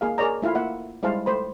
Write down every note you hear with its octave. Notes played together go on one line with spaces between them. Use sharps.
A#3 G#4 F5
G#4 A#4 C#5 D5 A#5
A3 E4 F4 F5
A#3 E5 F#5
G3 G#3 E4 C5 F5 A5
A3 C5 B5